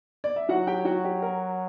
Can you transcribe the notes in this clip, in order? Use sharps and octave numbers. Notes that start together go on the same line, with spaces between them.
D5
E5
F#3 F#4 F#5
G4 G5
F#4 F#5
G4
A#4